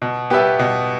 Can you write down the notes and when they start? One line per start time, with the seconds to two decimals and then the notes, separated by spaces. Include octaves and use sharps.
0.02 B2
0.30 B3 G4 B4 E5
0.59 B2